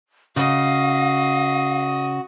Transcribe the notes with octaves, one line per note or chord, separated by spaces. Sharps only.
C#3 F#4 D#5 F5